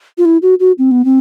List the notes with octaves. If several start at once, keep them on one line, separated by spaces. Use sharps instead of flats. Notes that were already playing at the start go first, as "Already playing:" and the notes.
F4
E4
F#4
F#4
C4
B3
C4